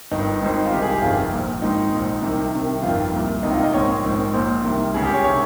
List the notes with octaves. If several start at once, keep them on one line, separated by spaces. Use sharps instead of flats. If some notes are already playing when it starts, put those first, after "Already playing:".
G1 G2 D#3 D#4
G#1 G#2 D#3
F4
C2 C3 D#3 G4
G#4
G4
G1 F2 C3 D#3 F4
A#1 A#2
G#1 G#2 D#3 D#4
A#1 A#2
C2 C3 D#3
C2 C3 D#3
G1 F2 D#3 F4
C2 A#2
C#2 C3 D#3 D#4
F4
D#5
A#1 G#2 D#3 C#5
A#1 G#2 D#3
A#1 A#2 C5
C2 C3 D#3
C#2 C#3 G#4
G4
C#5
C3 D#3 C#5